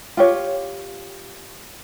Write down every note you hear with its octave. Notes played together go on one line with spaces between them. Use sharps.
F4 G4 C#5